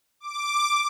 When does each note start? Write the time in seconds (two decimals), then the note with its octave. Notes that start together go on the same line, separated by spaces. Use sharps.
0.20 D6